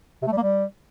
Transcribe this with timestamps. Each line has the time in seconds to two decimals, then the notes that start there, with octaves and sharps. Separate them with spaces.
0.22 C3
0.27 A3
0.32 G3
0.37 A#3
0.42 G3